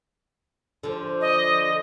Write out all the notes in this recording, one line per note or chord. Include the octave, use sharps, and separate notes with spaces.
D3 F3
D#5